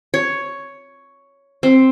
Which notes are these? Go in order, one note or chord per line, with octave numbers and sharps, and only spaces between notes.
C#5
C4